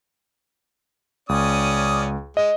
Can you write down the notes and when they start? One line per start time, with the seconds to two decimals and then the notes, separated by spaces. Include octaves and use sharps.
1.29 C#2 C#4 D5 D#6
2.37 G#3 D#5